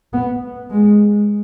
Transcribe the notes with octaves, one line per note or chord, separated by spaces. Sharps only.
B3
G#3